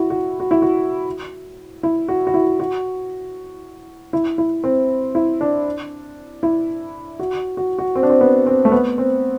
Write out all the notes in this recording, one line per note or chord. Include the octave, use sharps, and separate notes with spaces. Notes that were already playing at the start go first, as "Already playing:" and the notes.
Already playing: E4 F#4
F#4
F#4
E4
F#4
E4
F#4
F#4
E4
F#4
E4
E4
C4
E4
D4
E4
F#4
F#4
F#4
C4
D4
C4
B3
C4
A3
B3
C4